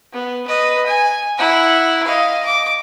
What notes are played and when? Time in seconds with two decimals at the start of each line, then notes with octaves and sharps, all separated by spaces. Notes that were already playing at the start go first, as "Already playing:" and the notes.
0.13 B3
0.47 B4 D#5
0.86 G#5
1.38 E4 F#5
2.04 D#5 F5
2.45 D6